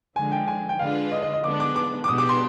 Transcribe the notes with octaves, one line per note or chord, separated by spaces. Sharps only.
D3 F3 G#3 G#5
G5
G#5
G5
D3 G#3 D4 F4 B4 F5
D#5
D#5
D#5
D3 G#3 B3 D4 D6
D6
D6
D6
B2 G#3 B3 D4 G4 D#6
D6
C6